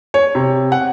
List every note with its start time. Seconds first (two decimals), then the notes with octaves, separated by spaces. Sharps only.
0.14 C#5
0.35 C3
0.72 F#5